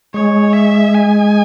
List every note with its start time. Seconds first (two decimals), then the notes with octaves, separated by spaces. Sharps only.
0.14 G#3 C#5
0.54 E5
0.94 G#5